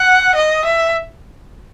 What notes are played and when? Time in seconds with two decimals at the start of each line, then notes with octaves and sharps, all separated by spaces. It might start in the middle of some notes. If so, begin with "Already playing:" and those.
Already playing: F#5
0.35 D#5
0.65 E5